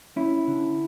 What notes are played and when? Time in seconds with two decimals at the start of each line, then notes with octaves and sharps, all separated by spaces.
0.16 C#4 E4
0.48 D3